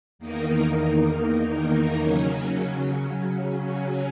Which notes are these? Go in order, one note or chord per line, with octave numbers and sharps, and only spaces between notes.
E2 D#3 A#3 D#4 A#4
C#3 F#3 C#4